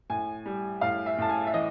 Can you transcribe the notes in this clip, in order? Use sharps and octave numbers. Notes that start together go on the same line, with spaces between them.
A2 G#5
G3
A2 F5
E5
A2 A5
G#5
E5
E3 D#5